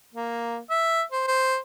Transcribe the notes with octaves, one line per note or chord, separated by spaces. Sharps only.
A#3
E5
C5
C5